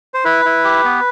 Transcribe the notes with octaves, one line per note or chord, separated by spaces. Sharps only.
C5
E4 B4
E4
G4
B3